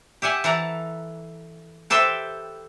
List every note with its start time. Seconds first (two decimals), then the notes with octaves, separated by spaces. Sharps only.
0.22 G4 E5 F#5 G#5
0.44 E3 A4 F#5 A#5
1.90 G4 A4 B4 C5 E5 G5